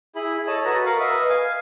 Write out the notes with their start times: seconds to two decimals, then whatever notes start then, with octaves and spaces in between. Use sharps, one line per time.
0.16 E4 G#4 B5
0.47 A4 C#5 D#5 A5
0.65 F#4 A4 B4 A#5
0.86 A#4 B4 F5 F#5 C#6
0.99 B4 D#5 E5
1.29 F5 G#5